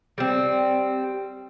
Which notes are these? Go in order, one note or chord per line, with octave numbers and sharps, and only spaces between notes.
G3 C4